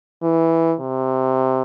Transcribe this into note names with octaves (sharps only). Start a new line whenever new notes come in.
E3
C3